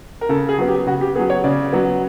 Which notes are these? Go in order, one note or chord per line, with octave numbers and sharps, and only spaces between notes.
A#4
C#3 A4
G#4
F#3 B3
G4
C#3 F#4
G4
F#3 B3 G#4
C#5
C#3 D5
F#3 B3